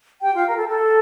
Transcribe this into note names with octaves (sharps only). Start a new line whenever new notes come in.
G4 G5
F4 F5
A#4
A4
A4